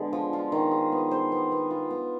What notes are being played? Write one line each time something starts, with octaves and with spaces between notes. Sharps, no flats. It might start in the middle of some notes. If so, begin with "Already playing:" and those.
Already playing: D3 G#3 B3
F3
F4
D#3
G#4
B3
C5
B3
B3
F4
B3